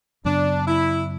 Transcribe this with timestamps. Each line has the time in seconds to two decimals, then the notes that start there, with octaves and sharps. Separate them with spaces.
0.25 F#2 C#3 F#3 B3 D4
0.67 E4